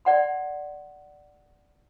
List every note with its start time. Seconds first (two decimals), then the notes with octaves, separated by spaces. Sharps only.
0.05 D5 F#5 C6